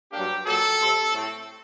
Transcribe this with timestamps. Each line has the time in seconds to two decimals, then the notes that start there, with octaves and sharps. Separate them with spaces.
0.12 G2 F#3 A#3 D4 G4
0.46 A#2 F#3 A#3 A4
0.80 C3 G3 C4
1.13 A2 A3 C4